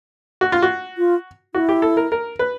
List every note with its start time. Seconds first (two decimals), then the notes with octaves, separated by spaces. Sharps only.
0.41 F#4
0.52 F4
0.62 F#4
0.98 F4
1.54 E4 F#4
1.69 G4
1.82 A4
1.97 A#4
2.12 A#4
2.39 B4